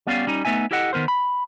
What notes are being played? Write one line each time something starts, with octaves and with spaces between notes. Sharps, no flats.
G3 B3 C#4 D5 F5
G3 C#4 D#4
A3 B3 D#4 E5 G#5
E4 G4 A4 D#5 F#5
D#3 B3 A#4 C5
B5